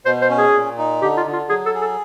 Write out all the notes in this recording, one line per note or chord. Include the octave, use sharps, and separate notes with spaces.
B2 C5
C5
C#4
G#4
A#2
D#4
D3 G4
F4
D3
F4
F#3 G#4
A4
G#4
A4